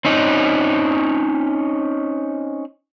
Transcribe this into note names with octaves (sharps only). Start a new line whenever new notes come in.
C4 C#4 D#4